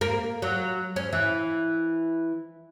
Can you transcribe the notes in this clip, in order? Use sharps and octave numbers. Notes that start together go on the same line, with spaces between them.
A#3
F#3
C#4
E3